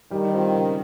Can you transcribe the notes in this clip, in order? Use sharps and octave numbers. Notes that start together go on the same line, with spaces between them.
D#3 G3
C4 F4
C#3